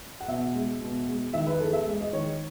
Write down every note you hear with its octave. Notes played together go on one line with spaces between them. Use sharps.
F#5
B2 E5
G#3
B2
G#3
D#3 E5
B4
E2 A4
E5
G#3
D#5
D#3 C#5